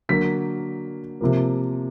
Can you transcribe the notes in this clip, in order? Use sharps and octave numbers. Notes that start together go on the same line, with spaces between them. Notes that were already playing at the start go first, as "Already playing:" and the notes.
D3 F#3 A#3 B6
C3 F3 A#3